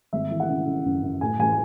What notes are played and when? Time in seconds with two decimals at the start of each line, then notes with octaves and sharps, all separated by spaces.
0.13 G#1 E5
0.31 E3
0.40 F#5
0.49 C#3
0.67 C#3
0.85 F#2
1.03 F#2
1.21 A2 G#5
1.38 A1 G#5